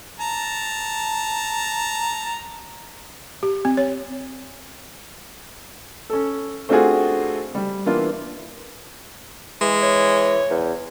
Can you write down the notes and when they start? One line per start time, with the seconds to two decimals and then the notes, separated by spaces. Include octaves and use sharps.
0.20 A5 A#5
3.43 G4
3.65 C4
3.77 C#5
6.10 C#4 A4
6.69 A3 C4 D4 F4 F#4 G#4
7.55 G3
7.86 E3 A#3 B3 D4 E4 F4
9.61 E3 G#3
9.82 C#5
10.50 E2